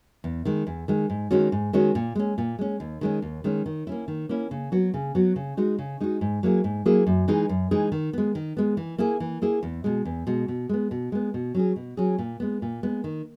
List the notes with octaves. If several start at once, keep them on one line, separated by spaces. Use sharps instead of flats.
E2
D#3 G#3
E2
D#3 G#3
G#2
D#3 G#3 C#4 F#4
G#2
D#3 G#3 C#4 F#4
A#2
G#3 C#4
A#2
G#3 C#4
D#2
D#3 G#3 C#4
D#2
D#3 G#3 C#4
D#3
A#3 C#4 E4
D#3
A#3 C#4 E4
C#3
F#3 B3 F#4
C#3
F#3 B3 F#4
C#3
G#3 D#4 F#4
C#3
G#3 D#4 F#4
G#2
F#3 A#3 E4 G#4
G#2
F#3 A#3 E4 G#4
F#2
E3 G#3 D#4 G#4
F#2
E3 G#3 D#4 G#4
D#3
G#3 B3
D#3
G#3 B3
E3
A#3 E4 G#4
E3
A#3 E4 G#4
E2
B2 G#3
E2
B2 G#3
B2
G#3 B3
B2
G#3 B3
B2
F#3 C#4 G#4
B2
F#3 C#4 G#4
A#2
G#3 B3
A#2
G#3 B3
D#3